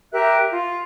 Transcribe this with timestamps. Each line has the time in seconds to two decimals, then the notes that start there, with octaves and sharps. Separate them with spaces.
0.12 G4 A#4 E5 F#6
0.51 F4